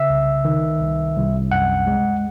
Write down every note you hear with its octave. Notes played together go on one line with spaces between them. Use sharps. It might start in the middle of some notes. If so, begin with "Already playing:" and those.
Already playing: C#3 E5
C2
D#3
C2
C2
F#2 F#5
G#3